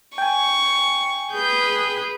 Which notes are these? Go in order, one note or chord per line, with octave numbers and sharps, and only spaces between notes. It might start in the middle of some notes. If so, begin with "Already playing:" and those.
G5 G#5 C#6
G#4 B4 G6